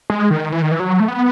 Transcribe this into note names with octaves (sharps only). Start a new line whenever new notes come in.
G#3
D#3
E3
D#3
E3
F#3
A3
B3